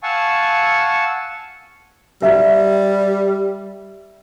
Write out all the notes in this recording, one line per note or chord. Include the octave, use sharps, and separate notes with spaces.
F5 F#5 G#5 A5 C#6 E6
G3 E5